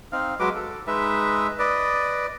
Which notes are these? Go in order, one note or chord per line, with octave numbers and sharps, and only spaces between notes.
C4 D#4 F5
F#3 G#3 B4 D6
A4
G#3 D#4 B4 E5
B4 D5 D#5